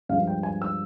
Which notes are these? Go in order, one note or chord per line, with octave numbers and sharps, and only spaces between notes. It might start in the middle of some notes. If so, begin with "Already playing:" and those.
G2 F3 G#3 F5
G5
G#5
E6